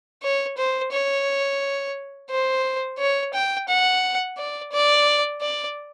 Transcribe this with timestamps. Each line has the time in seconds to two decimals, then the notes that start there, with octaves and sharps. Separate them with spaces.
0.22 C#5
0.57 C5
0.92 C#5
2.30 C5
2.99 C#5
3.33 G5
3.68 F#5
4.37 D5
4.72 D5
5.41 D5